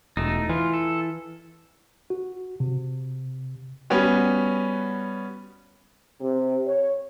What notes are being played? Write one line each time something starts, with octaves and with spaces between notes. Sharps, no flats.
E1 A3 D#4
E3 F4
A4
F#4
C3
G3 B3 C#4 F#4
C3
C#5